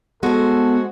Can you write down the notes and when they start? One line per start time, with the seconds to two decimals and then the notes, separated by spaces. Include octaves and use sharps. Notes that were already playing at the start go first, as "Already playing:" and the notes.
0.23 G#3 B3 F#4 A4 C5